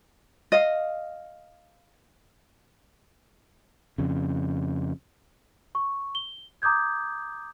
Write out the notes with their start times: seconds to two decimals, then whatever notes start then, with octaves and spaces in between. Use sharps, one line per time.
0.52 D#5 F5
3.98 F2 C#3
5.75 C#6
6.15 G7
6.62 A#5 D6 D#6 G6 G#6